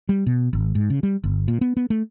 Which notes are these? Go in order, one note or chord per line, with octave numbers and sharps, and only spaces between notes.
G3
B2
G#1
G#2
C#3
G3
G1
A#2
B3
B3
A3